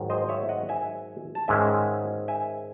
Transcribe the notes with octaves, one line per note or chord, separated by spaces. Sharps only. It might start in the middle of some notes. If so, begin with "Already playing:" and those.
Already playing: G#2 D#3 F#3
C5 D#5
C#5 E5
D#5 F#5
E5 G#5
A5
G#2 D#3 G#3 C#4 E5 G#5
E5 G#5